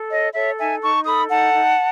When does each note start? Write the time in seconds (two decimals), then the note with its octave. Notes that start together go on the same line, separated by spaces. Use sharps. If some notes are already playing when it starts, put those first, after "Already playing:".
Already playing: A4
0.11 C#5 D#5
0.34 A4 C#5 E5
0.58 D#4 E5 G#5
0.82 D#4 A5 C#6
1.06 A4 B5 D#6
1.29 D#4 F#5 A5
1.53 D#4